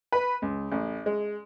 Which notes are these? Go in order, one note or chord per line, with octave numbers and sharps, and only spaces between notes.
B4
C#2
A1
G#3